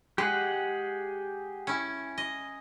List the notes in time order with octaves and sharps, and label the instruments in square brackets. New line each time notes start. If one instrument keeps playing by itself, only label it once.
[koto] G#3 [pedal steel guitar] G4 G#4 F#5
[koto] C#4 E4
D#5